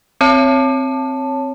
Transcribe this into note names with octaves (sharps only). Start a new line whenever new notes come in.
C4 C#5 A5